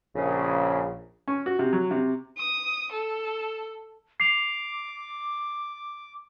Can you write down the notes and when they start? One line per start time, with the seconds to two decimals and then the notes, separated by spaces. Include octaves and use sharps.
0.15 A#1 C#3
1.28 C#4
1.46 F#4
1.59 C3
1.73 F#3
1.91 C3
2.38 D#6
2.92 A4
4.20 D6 C7 F7